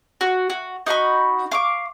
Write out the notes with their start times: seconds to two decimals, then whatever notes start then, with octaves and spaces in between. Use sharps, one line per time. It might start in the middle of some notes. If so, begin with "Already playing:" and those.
0.21 F#4
0.50 F#4
0.86 D#4 F#4 B5 C#6
1.51 F5 C#6 D6